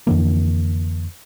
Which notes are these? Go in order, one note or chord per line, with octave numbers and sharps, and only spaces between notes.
F2 D3 E3 A#3